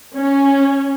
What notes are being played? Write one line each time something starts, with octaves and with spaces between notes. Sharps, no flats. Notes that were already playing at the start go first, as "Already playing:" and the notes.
C#4